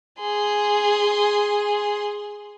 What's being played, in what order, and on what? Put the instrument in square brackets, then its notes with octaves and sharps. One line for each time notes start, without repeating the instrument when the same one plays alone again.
[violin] G#4 C6